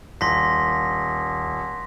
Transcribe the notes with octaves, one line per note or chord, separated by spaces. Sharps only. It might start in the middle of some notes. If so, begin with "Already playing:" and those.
D#1 C6 A#6 B6